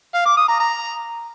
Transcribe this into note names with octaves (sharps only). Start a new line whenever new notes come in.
F5
D6
D#6
A#5
A#5